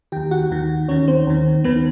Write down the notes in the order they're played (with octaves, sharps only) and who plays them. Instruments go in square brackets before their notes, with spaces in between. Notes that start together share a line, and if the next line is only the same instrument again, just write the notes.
[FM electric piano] D#2 D#3 G4 G5
F#4 F#5
D#2 D#3
D#2 D#3 C#4 C#5
C4 C5
D#2 D#3
D#2 D#3 B3 B4